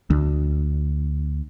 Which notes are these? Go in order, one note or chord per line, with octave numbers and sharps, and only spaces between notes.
D2